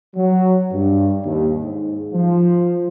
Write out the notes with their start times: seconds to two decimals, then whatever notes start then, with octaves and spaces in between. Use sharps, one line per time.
0.16 F#3
0.72 G2
1.24 D#2
1.61 G#2
2.13 F3